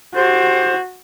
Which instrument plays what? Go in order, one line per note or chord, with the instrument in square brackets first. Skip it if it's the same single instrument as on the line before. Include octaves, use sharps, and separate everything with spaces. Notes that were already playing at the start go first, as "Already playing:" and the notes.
[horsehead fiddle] F#4 [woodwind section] G4 A4 C5